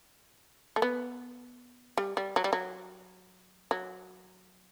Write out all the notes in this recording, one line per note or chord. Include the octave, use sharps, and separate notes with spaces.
A3
B3
G3
G3
F#3
G3
F#3
F#3